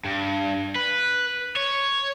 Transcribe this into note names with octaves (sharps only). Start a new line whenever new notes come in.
G2
B4
C#5